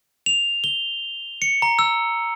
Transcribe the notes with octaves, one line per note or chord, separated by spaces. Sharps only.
F7
G7
C#7
A#5
E6